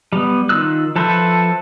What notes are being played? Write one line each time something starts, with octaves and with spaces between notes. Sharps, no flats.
G3 B3
D#3 F4 E6 F#6
F3 A4 B4 C5 E5